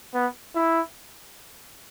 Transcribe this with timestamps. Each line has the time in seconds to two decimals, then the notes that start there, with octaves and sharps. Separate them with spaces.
0.14 B3
0.56 E4